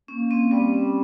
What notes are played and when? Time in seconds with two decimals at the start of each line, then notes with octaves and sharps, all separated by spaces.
0.08 A#3 C#4
0.31 C4
0.51 G3 C4
0.74 C#4